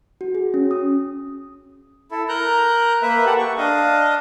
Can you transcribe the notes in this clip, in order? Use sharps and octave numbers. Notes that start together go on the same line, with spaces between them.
F#4
G#4
C#4
D#6
E4 A4
A#4 A#5 F#6 G6
A#3 B4 E5
G4 A4 F#5
C#6
D4 D#5 F5